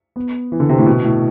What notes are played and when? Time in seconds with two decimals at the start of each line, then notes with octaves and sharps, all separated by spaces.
0.16 B3
0.52 E3
0.60 D3
0.69 C3
0.78 A2
0.86 B2
1.04 A2